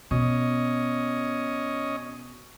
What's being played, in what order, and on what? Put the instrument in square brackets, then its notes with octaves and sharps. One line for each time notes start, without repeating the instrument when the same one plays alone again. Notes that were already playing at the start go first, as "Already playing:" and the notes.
[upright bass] B2 [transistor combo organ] C#4 D#5